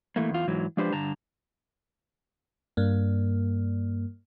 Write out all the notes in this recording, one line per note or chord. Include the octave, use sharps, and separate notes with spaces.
E3 A3 A#3
E2 F4
G#2 E3 F#3
F3 G#3 D4 G4 B4 C5
G2 D3 A5 A#5
G2 A#3